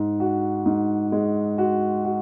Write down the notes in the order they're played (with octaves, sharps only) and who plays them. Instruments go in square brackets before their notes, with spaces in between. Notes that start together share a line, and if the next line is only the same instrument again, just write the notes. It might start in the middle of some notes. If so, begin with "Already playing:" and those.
Already playing: [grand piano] G#2
F#4
G#2
G#3
F#4
F#4